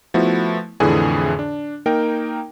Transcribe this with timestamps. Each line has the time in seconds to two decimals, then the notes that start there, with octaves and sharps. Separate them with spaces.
0.14 F3 A3 B3 E4 F#4
0.80 F2 A2 D3 E3 G#4 G#5
1.39 D4
1.86 A#3 D#4 A#4 G5